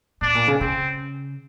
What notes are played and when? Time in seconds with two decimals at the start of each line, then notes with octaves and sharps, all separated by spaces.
0.21 A2 D4
0.35 A#2
0.48 C#3
0.61 C#3 C4